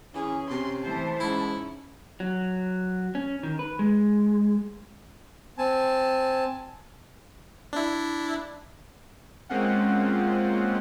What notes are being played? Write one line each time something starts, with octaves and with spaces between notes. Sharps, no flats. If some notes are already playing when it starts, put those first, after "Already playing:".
E3 C#4 G#4
C3 C6
E3 A3 C5 A5
G#2 C#4 E4
F#3
C#4
D#3
B4
G#3
C4 G#5 A5
D4 E4
G#3 A#3 C4 C#4 F4 F#5